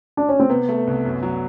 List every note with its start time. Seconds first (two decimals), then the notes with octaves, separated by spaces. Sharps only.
0.17 D4
0.29 C#4
0.40 C4
0.49 C3 B3
0.69 A3
0.87 C2
1.05 F#2
1.23 F#3